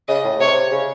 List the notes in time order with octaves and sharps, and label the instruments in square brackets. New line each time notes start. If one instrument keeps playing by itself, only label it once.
[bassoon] C#3 [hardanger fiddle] D#5
[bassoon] A2
[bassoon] C3 [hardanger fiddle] C#5
[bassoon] C#3